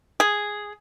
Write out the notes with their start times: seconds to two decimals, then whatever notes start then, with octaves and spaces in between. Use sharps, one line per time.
0.20 G#4